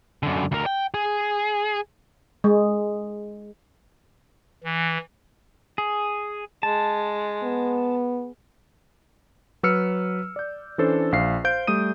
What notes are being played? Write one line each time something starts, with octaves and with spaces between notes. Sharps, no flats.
F#2 D3
D2 A#4
G5
G#4
G#3
E3
G#4
G#3 A5
B3
F#3 B4 E6 F6 C#7
D5 G6
E3 C#4 D4 A4 C5
A#1 F5 C7
C5 F5 G6 D7
G3 A3 D#6 D#7